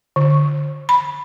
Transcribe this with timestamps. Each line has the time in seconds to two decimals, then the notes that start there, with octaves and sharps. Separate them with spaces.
0.16 D3
0.89 B5